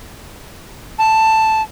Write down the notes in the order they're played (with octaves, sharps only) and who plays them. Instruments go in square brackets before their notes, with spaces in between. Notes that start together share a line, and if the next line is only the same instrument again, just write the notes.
[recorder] A5